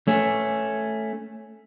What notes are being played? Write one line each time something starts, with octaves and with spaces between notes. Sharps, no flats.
A3 C#4